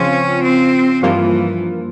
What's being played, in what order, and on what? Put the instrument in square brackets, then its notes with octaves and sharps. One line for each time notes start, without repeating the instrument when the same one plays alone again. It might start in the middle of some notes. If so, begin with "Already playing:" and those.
Already playing: [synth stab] C#3 F3 C4 F4 [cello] C#4
[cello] C4
[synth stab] G2 F3 A#3 F4 [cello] E3